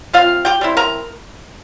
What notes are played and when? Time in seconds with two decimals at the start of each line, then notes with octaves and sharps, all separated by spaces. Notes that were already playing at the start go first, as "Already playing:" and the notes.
0.13 C3 F4 F5
0.45 G4 G5
0.61 G3 C4 E4
0.77 A#4 A#5